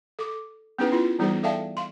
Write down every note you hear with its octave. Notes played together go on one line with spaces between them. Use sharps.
A4 D6
B3 C#4 D#4 E4 G#4 B4
E4 F4
E3 G3 B3 D#4 G#4 C5
A4 D5 E5 F5 G5 A5
F5 C6